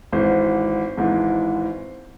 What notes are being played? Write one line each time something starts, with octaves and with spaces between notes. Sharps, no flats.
G#1 G#2 E3 C5
G#1 G#2 E3